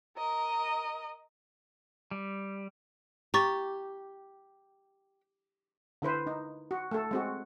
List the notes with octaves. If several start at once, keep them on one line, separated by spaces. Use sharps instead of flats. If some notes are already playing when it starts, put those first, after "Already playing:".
A#4 D#5
G3
G4 A#5 C#6 A6
D3 E4 B4 C5
D#4
F#4
A3 A4
G#3 C4 F#4